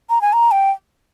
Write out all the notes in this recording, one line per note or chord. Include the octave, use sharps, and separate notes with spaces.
A#5
G#5
A#5
G5